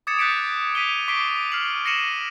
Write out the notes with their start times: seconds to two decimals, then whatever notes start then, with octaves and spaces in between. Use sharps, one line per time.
0.07 D6 D#6 G#6 A6 C#7 E7
0.19 F#6 G6 A6 B6 C#7 D7
0.75 B6 D#7 F7 G7
1.08 C#6 D6 B6 C7 D7 G7
1.52 F6 C7 D#7 F#7
1.85 A#6 C7 C#7 D#7 E7 F#7